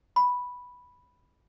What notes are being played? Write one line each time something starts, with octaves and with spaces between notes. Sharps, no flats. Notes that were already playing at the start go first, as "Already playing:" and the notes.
B5